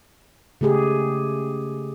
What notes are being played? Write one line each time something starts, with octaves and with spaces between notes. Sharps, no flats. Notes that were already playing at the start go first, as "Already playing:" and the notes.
C#3 A3 G4 G#4